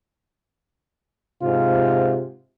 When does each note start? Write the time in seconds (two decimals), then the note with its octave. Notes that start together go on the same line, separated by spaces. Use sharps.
1.42 G#2 C3 F4